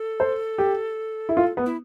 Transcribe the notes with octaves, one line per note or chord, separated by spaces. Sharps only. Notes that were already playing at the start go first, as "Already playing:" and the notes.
Already playing: A4
C5
G4
E4
F4
B3
E4